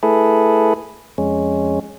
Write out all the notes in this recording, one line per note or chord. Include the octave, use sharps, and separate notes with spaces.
A3 E4 G#4 A4 B4
F2 G#3 C#4